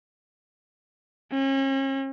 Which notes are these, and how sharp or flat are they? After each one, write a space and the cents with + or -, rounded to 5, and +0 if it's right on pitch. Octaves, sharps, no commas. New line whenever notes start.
C#4 -40